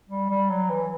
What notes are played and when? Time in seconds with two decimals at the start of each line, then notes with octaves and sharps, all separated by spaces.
0.10 G3
0.30 G3
0.49 F#3
0.70 E3